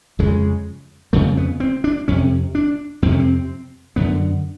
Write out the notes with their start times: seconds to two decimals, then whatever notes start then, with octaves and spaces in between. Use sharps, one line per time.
0.19 F2 C#3 G#3
1.13 F2 C#3 A3
1.37 B3
1.60 C4
1.84 D4
2.08 F2 C3 C#4
2.55 D4
3.02 F2 C3 C4
3.11 C#4
3.20 C4
3.96 F#2 D3 B3